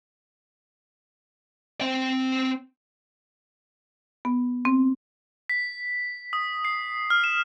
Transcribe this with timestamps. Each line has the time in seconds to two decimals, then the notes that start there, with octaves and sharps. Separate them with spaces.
1.81 C4 G5
4.25 B3
4.65 C4
5.49 B6
6.33 D#6
6.65 C7
7.10 F6
7.24 E7